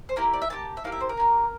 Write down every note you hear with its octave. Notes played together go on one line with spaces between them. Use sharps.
C5
A#3 E4 G4 A#4
D5
E5
A#3 E4 G4 A5
E5
A#3 E4 G4 F5
E5
C5
A#4
A#3 E4 G4